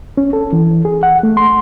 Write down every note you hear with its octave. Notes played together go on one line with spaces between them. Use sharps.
C#4
A4
E3
G#4
F#5
A3
C6